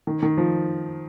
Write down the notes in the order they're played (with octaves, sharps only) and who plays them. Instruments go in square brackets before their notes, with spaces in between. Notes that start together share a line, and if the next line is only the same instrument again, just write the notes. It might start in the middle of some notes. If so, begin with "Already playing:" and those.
[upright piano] D#3
D#3
F3